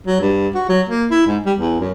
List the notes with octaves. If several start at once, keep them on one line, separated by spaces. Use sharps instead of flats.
F#3
G2
F#4
F#3
A#3
E4
G#2
G3
E2
F#2